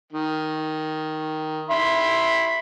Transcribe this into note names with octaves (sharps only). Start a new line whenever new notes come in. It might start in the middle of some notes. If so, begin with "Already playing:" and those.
D#3
E5 B5 C6